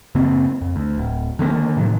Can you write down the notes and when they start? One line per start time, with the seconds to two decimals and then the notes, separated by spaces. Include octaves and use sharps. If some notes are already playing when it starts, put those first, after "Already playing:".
0.15 F#2 C#3 A#3 C4
0.62 F2
0.76 D2
0.98 D1
1.39 D3 D#3 G#3 A#3
1.77 A2 C3 D#3 F#3